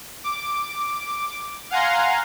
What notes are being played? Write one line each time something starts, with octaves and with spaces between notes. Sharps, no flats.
D6
F5 F#5 G#5 A#5 C6